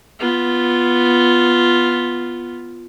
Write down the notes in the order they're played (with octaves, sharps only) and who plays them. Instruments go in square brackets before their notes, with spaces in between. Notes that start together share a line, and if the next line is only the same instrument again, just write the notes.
[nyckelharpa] B3 F4